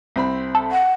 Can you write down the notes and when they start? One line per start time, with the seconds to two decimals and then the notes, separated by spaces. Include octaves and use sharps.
0.16 C2 C4 B5
0.55 A4
0.72 F#5